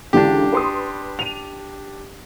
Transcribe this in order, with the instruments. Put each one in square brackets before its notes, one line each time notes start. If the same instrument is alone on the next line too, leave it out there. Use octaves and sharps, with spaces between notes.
[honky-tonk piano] C#2 D3 E3 [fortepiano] D4 G4
[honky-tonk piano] B4 C6 D#6
D#7 F7